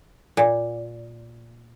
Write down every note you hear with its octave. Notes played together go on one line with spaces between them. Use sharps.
A#2